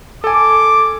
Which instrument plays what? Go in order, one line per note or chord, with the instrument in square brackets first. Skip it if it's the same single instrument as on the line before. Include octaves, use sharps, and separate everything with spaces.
[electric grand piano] A4 G#5 [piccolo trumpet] D6